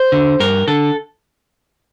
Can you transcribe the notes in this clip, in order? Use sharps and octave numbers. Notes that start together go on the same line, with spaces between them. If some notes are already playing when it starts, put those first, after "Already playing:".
Already playing: C5
D3
G2 A#4
D3 A4